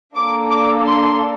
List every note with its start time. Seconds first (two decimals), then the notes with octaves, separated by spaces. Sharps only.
0.15 A#3 D4 A4 D6
0.51 D6
0.86 C6